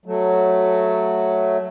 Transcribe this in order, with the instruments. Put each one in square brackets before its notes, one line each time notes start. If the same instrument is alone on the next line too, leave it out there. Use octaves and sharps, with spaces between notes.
[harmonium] F#3 A3